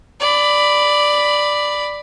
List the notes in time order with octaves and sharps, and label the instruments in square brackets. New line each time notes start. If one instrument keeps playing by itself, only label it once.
[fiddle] D5 B5